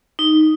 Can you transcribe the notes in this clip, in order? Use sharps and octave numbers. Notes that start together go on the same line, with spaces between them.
D#4